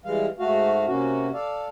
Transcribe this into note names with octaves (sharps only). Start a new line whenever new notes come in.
E3 G3 G#3 F5
G#2 A3 F#4 F5
C3 A#3 C#4 F#4
A4 D5 F5